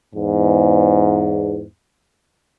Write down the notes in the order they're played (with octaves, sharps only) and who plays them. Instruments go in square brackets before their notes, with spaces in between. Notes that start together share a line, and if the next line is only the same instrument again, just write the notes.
[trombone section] E2 G#2